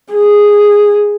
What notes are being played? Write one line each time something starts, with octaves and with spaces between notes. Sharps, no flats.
G#4